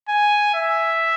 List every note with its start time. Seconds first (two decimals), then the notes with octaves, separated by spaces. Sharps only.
0.09 G#5
0.54 E5